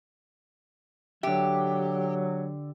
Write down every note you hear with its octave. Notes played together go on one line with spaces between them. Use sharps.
D3 F#3 G4 E5